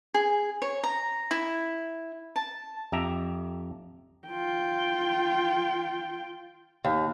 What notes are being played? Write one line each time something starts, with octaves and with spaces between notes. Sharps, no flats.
G#4
C#5
A#5
E4
A5
F2 G4 E5 A#5
F4 G5
D#2